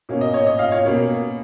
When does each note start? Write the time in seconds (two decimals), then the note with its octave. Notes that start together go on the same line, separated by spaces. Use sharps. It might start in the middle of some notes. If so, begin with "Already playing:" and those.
0.09 B2 A#3 C#4
0.21 D#5
0.34 C#5
0.47 D#5
0.59 F5
0.72 C#5
0.85 B2 A#3 C#4